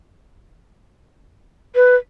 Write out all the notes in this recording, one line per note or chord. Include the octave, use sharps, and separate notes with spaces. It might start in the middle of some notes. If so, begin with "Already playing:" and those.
B4